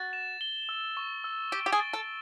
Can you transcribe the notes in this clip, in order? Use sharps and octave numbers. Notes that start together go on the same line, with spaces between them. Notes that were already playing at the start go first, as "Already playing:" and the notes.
Already playing: F#4 A6
E7
G7
E6
C#6
E6
G4 D7
G4
G#4
A6
A4